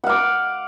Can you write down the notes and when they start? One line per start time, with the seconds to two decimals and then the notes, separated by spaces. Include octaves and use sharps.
0.04 F#5
0.06 F5
0.09 D6